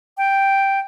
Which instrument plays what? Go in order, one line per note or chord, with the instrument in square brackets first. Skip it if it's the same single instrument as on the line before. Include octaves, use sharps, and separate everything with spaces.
[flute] G5